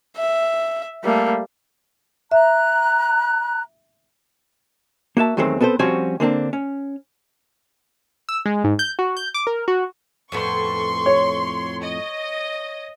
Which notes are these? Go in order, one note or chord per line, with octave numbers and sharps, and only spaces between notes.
E5
G3 A3 A#3
E5 A#5 F#6
A#3 F#4 E5 A5
E2 D#3 F#3 G#3 A3 C4
B3 C4 A4 B4 C5
F3 G3 C4 C#4 F#4 C#5
D3 A#3 C4 D4
C#4
E6
G#3
G#2
G6
F#4
G6
D6
A#4
F#4
F2 A2 B3 C6 C#6
C#5
D#5